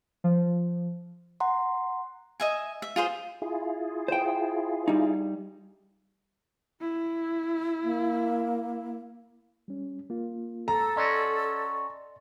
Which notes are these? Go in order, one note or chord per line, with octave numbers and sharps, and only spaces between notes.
F3
F#5 A#5 C6
D#5 E5 G#5
E5
F4 G#4 C5
E4 F4 G#4
C5 G5
G3 D#4
E4
A#3
G3 C#4
A#3 F4
A4 A#5
C#4 F#4 D5 D#5 C6